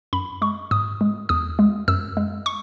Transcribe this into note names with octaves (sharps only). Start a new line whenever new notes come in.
F#2 B5
G#3 C#6
G#2 D#6
G#3
E2 D#6
G#3
F#2 E6
G#3
C#6